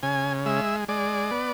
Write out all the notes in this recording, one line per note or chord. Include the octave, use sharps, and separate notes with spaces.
C#3 G#5
G#3 E5
G#3 D5
B3